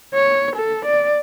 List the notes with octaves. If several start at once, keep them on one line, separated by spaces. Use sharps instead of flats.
C#5
A4
D5